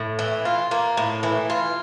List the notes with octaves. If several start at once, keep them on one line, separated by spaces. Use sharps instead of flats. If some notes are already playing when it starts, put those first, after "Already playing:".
Already playing: A2
E3
F4
A#3
A2
E3
F4